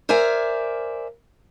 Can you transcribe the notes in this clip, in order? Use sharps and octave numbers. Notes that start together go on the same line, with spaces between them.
A#4 C5 D5 E5 G#5